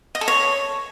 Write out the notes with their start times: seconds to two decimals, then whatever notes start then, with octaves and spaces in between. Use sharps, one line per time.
0.15 D#5
0.21 A4
0.28 C#5